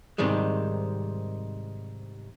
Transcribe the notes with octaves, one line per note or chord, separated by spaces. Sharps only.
G#2 C3 D#3 G3 G#3